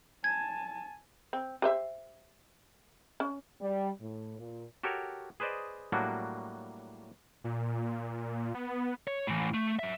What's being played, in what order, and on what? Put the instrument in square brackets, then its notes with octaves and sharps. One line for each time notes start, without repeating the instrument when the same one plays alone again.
[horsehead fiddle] G#5 A5 [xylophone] G#6
[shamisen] C4
G4 C5 E5
C#4
[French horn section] G3
A2
A#2
[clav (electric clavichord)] F#4 G4 A4 A#4 C#5
G#4 B4 C5 D5 D#5
A2 F#3 G3 A#3 D4 F#4
[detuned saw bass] A#2
B3
[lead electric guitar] C#5
A2 E3
A3
F#3 E5